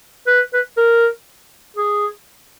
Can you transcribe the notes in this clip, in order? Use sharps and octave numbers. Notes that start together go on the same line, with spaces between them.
B4
B4
A#4
G#4